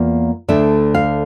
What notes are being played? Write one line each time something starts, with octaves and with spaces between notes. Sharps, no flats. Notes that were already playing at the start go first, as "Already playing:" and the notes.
Already playing: E2 A#3 F4
D2 D3 A3 D4 E5
F5